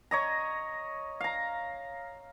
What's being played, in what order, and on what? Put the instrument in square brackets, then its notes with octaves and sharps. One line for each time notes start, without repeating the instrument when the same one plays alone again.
[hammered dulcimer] C#5 D#5 A#5
F5 A#5